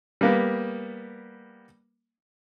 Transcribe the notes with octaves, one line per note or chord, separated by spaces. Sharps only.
G3 A#3 B3